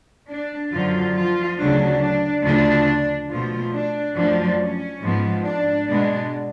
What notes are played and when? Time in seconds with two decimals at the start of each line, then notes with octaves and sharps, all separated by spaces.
0.30 D4
0.73 F#2 D3 F3 F#3 F4
1.16 F3 F4
1.59 D2 C#3 F#3 A3 D4
2.02 D4
2.44 D2 C#3 F3 A3 D4
3.30 B2 F3 A3 F4
3.73 D4
4.16 F#2 F3 A3 D4
4.59 C#4
5.02 G#2 F3 B3
5.44 D4
5.87 B2 G#3 B3 D4